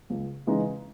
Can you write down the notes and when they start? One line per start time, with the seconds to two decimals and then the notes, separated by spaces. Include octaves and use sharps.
0.10 C#2
0.47 C#3 E3 G#3 D#4